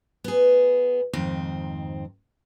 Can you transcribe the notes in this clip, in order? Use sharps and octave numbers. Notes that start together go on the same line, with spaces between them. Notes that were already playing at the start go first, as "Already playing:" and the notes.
B3 G#4
F2 G#2 D#3 C4